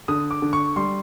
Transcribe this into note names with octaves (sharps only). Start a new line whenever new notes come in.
D3 D#6
D6
D3
C#6
G3 C6